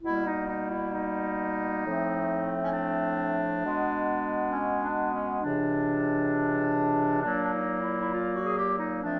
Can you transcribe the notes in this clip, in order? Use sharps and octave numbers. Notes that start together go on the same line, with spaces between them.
B2 G3 A#3 E4
D#4
D#4
E4
D#4
A2 F3 A3 C4
C#4
D4
B2 G#3 B3
C#4
D4
C#4
C#2 C3 E3 D4
A#2 F#3 A#3 D4
D4
D#4
E4
E4
F4
F#4
G#4
G4
D#4
A#2 F3 A3 C4 D4